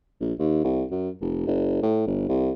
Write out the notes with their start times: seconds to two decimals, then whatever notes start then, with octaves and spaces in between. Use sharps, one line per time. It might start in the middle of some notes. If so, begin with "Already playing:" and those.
0.21 A#1
0.39 D#2
0.64 C2
0.91 F#2
1.21 F1
1.46 F#1
1.82 A2
2.07 G1
2.28 C2